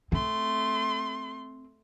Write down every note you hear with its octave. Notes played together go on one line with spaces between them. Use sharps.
A3 C4 C6